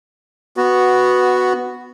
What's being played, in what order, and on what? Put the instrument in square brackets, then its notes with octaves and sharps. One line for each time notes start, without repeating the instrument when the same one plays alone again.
[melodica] B3 F#4